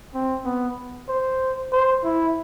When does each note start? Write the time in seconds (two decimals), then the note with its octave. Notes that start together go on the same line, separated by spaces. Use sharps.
0.14 C4
0.45 B3
1.09 C5
1.73 C5
2.04 E4